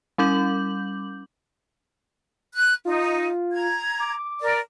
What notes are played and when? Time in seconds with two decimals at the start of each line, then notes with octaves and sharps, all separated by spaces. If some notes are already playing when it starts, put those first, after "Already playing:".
0.18 G3 C#4 D6 G6 F#7
2.56 F#6
2.85 D#4 F4
3.52 A#5 G#6
4.00 D6
4.41 A#4 D5